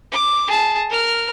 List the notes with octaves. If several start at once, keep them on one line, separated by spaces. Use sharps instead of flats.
D6
G#4 A5
A#4 F6